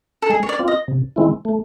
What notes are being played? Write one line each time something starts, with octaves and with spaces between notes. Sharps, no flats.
A4
G#3 G#4
C#5
D5
C4 F4
D#5
C3
D#3 G#3 C4 E4
A3